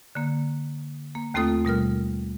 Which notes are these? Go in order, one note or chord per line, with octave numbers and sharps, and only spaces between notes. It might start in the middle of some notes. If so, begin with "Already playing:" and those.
D3 A#3
A#3
D#2 A3 C4 F4 A4 D#6
B2 G3 A#4 F6